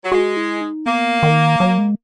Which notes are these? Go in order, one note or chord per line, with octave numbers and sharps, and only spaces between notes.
F#3
G#3 F#4
E4
D#4
A#3 B3
D#3
F#3
G#3